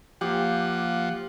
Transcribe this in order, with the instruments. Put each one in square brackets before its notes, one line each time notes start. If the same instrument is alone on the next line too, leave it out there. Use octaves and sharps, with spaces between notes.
[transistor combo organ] F3 F#5 [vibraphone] A#3 F5 D6 [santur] G4